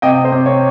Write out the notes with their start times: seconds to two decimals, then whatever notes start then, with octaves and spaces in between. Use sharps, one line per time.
0.02 C3 D#5 G5
0.25 C5
0.32 C3
0.46 C#5